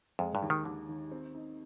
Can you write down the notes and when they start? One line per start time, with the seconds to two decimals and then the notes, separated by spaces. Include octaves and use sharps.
0.19 F2 G#3
0.35 G2
0.42 D#2
0.50 D#3
0.65 D#2 D3
0.89 D#3
1.11 C4
1.35 D#4